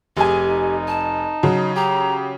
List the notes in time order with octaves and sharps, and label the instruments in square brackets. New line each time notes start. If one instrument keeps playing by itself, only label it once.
[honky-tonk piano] F1 G#5 [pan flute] G4 [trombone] G#4
[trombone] D#4
[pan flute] A5
[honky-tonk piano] C#3 F#3
[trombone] G4 [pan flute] A#5